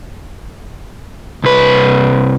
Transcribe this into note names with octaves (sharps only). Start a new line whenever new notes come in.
C2 B4